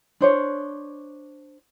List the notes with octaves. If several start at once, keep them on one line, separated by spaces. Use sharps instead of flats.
D4 C5 C#5